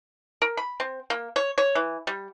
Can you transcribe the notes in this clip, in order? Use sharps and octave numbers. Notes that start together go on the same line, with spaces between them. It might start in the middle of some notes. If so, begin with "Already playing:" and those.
A#4
B5
C4
A#3
C#5
C#5
E3
G3